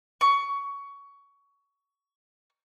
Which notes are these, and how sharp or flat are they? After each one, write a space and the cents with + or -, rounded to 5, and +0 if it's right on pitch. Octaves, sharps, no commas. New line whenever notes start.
C#6 +20